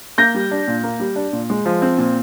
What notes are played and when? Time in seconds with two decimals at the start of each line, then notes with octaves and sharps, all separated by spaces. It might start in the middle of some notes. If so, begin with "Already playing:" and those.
0.18 A#3 G6 A#6
0.34 G3
0.51 D4
0.68 A#2
0.84 A#3
1.00 G3
1.16 D4
1.33 A#2
1.50 G#3
1.66 F3
1.82 C4
1.98 A#2